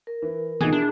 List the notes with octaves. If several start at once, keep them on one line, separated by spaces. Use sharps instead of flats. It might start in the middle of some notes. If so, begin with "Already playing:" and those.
A#4
E3
B2 E3 F3 D#4 G#4
D4 E4